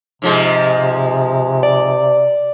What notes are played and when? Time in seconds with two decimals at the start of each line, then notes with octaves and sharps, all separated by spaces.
0.22 G#2 C3 F3 G#3
1.63 D5